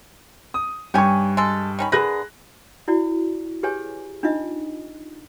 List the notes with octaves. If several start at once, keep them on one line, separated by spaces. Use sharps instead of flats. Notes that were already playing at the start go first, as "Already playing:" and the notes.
D#6
G2 C#4 G4 G5 G#5 C#6
G#3 A4
D#3 C#4 B5
D3 G#4 A#4 B4 F#6 A#6
E4 F#4 D5
G4 G#4 B4 C#5 G#5
D4 D#4 F4 D#5 E5